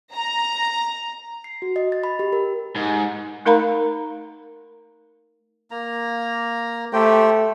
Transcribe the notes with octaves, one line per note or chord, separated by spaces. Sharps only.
A#5
C7
F#4
D#5
A6
B5
G4
A#4
G#2
A3 D#4 A#4 F5 A#5 B5
A#3 A#5
A3 G4 C5 G5